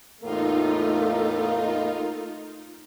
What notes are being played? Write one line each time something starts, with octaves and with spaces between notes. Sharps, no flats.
E2 A2 A3 A#3 D#4 F4